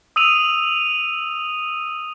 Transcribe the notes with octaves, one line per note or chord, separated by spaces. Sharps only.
D#6 E6 D#7 F7